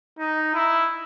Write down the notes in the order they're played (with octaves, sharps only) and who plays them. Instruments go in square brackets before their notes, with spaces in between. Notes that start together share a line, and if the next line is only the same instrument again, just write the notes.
[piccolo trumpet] D#4
E4